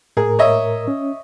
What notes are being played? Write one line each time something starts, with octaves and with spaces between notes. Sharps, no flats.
A2 G#4 A#4
C#5 D#5 E5
C#4